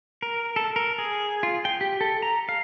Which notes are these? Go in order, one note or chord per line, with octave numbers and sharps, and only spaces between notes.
A#4
A4
A#4
G#4
F4
G5
G4
A4
A#5
F5